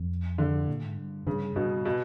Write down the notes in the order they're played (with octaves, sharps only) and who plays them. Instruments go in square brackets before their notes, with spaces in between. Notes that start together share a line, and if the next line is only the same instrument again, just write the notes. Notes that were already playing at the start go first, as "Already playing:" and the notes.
Already playing: [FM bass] F2
[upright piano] D3
[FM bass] A#2
G#2
G2
[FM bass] G2 [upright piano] C#3
[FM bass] G2 [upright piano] B2
[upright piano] B2